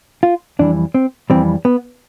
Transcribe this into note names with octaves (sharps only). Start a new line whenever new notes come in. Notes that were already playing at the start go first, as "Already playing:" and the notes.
F4
F2 E3 G3 D4
C4
F2 E3 G3 C4
B3